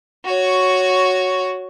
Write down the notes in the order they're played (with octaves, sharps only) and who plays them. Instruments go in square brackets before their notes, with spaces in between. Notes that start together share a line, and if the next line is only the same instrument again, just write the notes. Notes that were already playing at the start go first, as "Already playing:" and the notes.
[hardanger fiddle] F#4 C#5